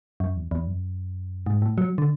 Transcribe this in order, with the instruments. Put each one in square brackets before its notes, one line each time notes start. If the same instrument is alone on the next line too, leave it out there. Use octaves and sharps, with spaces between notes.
[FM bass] F#2
E2
E2
F#2
G#2
A2
F#3
D3